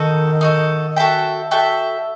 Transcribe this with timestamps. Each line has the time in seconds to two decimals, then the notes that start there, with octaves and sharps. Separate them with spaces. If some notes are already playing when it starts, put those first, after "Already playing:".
Already playing: D#3 D#4 F#4 A4
0.41 D#4 F#4 A4
0.96 F#4 A4 E5 G5
1.51 F#4 A4 E5 G5